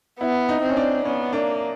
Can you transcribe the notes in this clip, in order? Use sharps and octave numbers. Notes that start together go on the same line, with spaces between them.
B3 E4
D#4
C4
C#4
D4
B3 C#4
A#3 D4